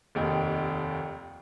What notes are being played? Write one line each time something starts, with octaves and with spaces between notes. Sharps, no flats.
F1 D#2 D#3